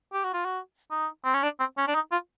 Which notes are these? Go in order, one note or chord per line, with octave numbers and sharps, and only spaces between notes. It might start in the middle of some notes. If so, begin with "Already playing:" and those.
G4
F#4
F4
F#4
D#4
C4
C#4
D4
C4
C#4
D4
D#4
F4